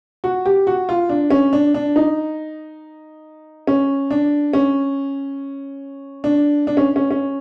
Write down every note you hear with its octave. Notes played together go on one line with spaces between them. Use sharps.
F#4
G4
F#4
F4
D4
C#4
D4
D4
D#4
C#4
D4
C#4
D4
D4
C#4
C#4
C#4